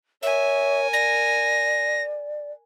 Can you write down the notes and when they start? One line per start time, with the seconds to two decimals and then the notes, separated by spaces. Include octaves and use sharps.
0.23 A#4 C#5 E5 G#5
0.93 D5 A#6